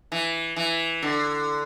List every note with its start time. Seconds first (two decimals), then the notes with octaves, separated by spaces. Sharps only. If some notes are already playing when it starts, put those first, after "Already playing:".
0.12 E3
0.56 E3
1.02 D3